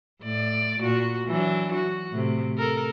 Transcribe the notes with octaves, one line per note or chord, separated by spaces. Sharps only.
A2 D5
A#2 F#4
E3 F#3 D4
F#4
A2 C3
A4 A#4